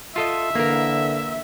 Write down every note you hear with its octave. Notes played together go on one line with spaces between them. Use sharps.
F4 A4 D#5 E5
D3 E3 A#3 A#4